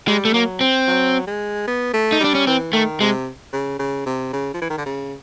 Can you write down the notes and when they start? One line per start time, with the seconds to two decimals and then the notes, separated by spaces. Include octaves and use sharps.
0.08 G3 G#3
0.25 A3
0.34 F#3 A#3
0.61 C4
0.87 F#3
1.27 G#3
1.67 B3
1.93 A3
2.12 D#4
2.20 G3 D4
2.35 C#4
2.46 E3 C4
2.73 D#3 A3
3.00 C3 G#3
3.53 C#3
3.79 C#3
4.06 C3
4.33 C#3
4.54 F3
4.62 E3
4.70 D#3
4.78 D3
4.86 C#3